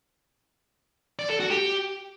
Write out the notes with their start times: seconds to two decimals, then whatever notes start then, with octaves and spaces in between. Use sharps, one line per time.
1.19 D5
1.29 A4
1.40 F#4
1.50 G4